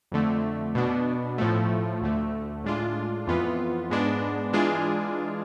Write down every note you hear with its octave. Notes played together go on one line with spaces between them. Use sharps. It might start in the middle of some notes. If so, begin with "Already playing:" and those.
F2 D3 A3
B2 B3 D4
A2 F3 A3
D2 D3 A3
A2 G#3 D4 F4
F2 E3 B3 F4 B4
G#2 G#3 B3 D4
E3 G#3 D4 F4 G#4